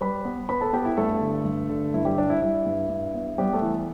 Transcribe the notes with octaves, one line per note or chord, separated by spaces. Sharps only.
G3 B4 B5
B3
B3 B4 B5
A4 A5
B3 G4 G5
E4 E5
G2 A3 A4
D3
G2
D3
G2 E4
G3 G4
G3 D4
E4
G3 E4
G2
G2
B3
G3 B3 G4
A3 A4
E3